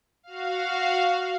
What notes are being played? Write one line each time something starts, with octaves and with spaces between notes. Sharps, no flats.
F#4 F5